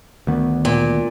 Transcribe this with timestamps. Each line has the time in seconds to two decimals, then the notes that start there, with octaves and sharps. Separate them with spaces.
0.27 D2 D#3 B3
0.65 A#2